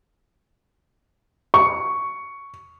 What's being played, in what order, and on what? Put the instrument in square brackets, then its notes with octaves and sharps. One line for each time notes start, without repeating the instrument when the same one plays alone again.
[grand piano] C#6